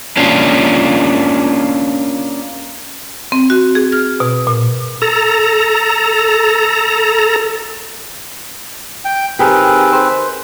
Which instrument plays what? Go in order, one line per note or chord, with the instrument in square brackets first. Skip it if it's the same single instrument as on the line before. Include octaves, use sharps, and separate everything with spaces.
[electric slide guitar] A#3 C#4 D4 F4
[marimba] C4
F#4
G#4
F6
B2
A#2
[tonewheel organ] A4 A#5
[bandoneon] G5
[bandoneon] D#3 C4 B4 [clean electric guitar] G4 G#4 A#4
[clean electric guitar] C5